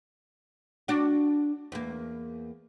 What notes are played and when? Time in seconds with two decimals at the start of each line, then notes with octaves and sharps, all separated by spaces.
0.88 D4 F#4
1.72 E2 A#3